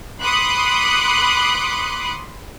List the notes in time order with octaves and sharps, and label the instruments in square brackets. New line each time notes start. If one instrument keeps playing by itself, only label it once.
[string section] B5 C6 D6 D#6 F#6 C#7